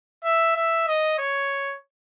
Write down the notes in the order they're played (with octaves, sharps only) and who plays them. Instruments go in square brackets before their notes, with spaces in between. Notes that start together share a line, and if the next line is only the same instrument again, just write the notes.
[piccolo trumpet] E5
E5
D#5
C#5